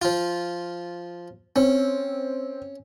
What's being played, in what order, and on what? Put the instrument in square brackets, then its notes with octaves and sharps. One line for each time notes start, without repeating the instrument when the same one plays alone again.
[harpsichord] F3 F4
[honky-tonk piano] C4 [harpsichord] C#4